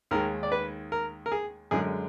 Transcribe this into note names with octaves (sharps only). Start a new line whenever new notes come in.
D#2 D#3 G#3 A#4
D5
B4
A#4
A#4
G#4
F#2 D3 G#3 G#4